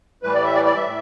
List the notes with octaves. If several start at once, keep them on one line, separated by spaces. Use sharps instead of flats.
A2 E3 G3 B4
D5
E5
D5
D5
E5
A2